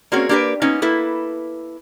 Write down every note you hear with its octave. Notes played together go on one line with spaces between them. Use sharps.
A#3 C4 C#4 F#4 G#4 C#5
A#3 D4 G4 A#4 B4
A#3 B3 C#4 D#4
A#3 E4 A4 B4